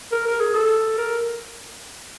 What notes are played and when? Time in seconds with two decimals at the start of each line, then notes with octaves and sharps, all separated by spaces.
0.12 A#4
0.27 A#4
0.40 G#4
0.55 A4
0.98 A#4